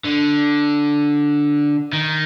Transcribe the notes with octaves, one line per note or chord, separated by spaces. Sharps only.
D3
D#3